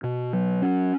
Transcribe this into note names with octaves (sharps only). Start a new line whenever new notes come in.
B2
F#3
C#4